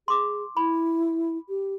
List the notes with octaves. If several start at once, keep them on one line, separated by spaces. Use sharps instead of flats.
G#4 C6 D6
E4 B5
G4